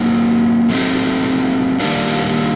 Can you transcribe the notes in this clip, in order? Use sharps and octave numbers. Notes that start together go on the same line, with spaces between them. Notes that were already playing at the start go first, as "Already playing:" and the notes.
Already playing: F#3 A#3 D#4
F#3 A3 C4 D#4
D#3 G3 A#3 D4